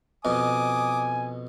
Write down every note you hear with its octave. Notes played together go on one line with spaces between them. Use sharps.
F2 B2 G#5 D6 D#6